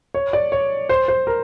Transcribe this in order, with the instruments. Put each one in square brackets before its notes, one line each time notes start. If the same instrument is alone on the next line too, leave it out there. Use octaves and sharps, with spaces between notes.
[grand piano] C#5
D5
C#5
C5
C5
A#4